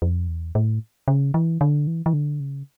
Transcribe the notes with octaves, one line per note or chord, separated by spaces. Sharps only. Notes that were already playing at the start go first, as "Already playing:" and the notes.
F2
E2
A2
C#3
E3
D3
E3
E3
D3
C#3